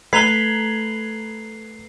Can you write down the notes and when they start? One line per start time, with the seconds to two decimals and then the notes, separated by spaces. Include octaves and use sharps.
0.13 A3 B4 A#5 G#6 B6 C7 F7 G7